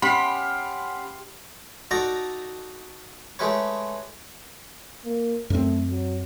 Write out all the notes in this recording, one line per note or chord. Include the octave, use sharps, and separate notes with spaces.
C#4 G4 F5 F#5 B5 C6
D#4 F#4 A4 D5 A#5
G#3 A3 G4 B4 C#5
A#3
F#2 A3 C4
F#3